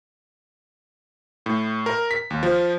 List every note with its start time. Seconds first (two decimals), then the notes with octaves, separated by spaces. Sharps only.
1.46 A2
1.86 A#4
2.11 B6
2.30 D#2
2.43 F3